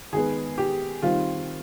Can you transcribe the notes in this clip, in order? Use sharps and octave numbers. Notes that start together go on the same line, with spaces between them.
D#3 G#3 B3 G#4
G4
D#3 G3 C4 F4